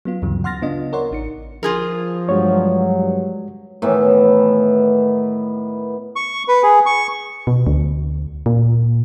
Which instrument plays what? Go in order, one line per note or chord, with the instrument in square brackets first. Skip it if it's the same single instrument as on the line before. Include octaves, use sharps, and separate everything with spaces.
[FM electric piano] F#3 B3 F4
D2 G2 C#3 E3 F#3
F#5 C6 F6 A6 A#6
C#3 B3 D4 F4 D#5
A#4 C#5 D5 F#5 C6
A1 D#4 C#7
[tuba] F3 [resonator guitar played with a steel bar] F4 G#4 A#4
[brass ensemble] G2 F#3 [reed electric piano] G#3 C#5
[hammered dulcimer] A2 D#3 E3 B3
[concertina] C#6
B4
G#4
C#6
[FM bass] B2
D2
A#2